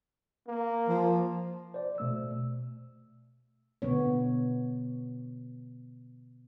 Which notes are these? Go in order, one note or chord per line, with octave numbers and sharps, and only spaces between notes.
A#3
F3
C5 D5
B2 A3 E6
B2 D3 B3 C#5